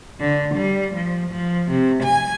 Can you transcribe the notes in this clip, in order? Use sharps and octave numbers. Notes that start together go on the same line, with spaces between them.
D3
G3
F3
F3
C3
G#5